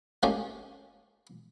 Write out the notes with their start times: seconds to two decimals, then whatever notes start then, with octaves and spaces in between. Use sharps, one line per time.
0.23 A3 A#3 C#4 D#4 G4